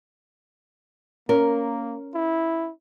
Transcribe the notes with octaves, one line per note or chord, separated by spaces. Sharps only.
A#3 C#4 A#4
E4